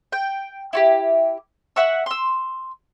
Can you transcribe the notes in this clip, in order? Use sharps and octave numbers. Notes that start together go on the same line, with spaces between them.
G5
E4 F#4 G4
E5 F#5 C#6 E6
C6 E6